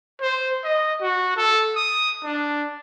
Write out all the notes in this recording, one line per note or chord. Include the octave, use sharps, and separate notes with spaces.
C5
D#5
F#4
A4
D#6
D4